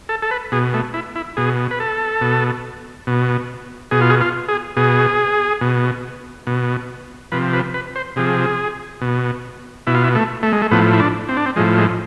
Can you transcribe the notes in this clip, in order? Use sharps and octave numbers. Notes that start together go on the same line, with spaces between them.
A4
A4
B4
B2 G#4
A3
E4
E4
B2 G#4
B4
A4
B2
B2
B2 G#4
F4
G#4
F4
G#4
B2 G#4
B2
B2
C3 F3 B4
B4
B4
C5
C3 F3 G#4
B2
B2 E4
F4
E4
A3
A3
G#3
A3
A2 F3 B3
E4
D4
C4
D4
C4
A2 F3 G#3
G#3